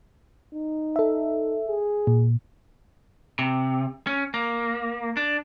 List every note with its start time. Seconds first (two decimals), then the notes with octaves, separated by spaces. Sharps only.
0.54 D#4
0.96 A4 E5
1.67 G#4
2.07 A#2
3.39 C3
4.07 C#4
4.34 A#3
5.17 D4